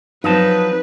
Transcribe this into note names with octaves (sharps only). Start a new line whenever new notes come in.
F3 F#3 C4 D#4 B4 A5